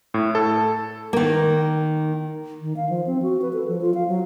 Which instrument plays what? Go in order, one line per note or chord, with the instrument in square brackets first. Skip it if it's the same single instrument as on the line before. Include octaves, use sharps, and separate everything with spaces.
[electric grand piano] A2
A4
[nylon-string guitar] D#3 A#3
[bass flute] D#3
F5
F3
C4
F#4
B4
A4
F3
F4
F5
F#3